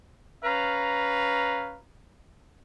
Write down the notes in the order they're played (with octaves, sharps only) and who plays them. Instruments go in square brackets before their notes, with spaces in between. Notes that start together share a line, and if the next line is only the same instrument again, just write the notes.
[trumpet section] C#4 B4 F5 A#5